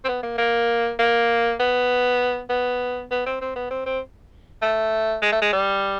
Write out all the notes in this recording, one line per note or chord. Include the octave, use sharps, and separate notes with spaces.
C4
B3
A#3
A#3
A#3
B3
B3
B3
C4
C4
B3
C4
C4
A3
G#3
A3
G#3
G3